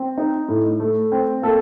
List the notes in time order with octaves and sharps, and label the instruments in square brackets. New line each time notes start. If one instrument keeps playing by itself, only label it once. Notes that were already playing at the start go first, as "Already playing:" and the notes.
Already playing: [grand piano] C4
D#4
A2
A3
C4
A#3 A4